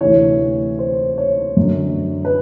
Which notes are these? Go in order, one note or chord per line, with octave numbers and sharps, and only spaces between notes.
D2 C3 E3 C#5
C5
C#5
F#2 D3
B4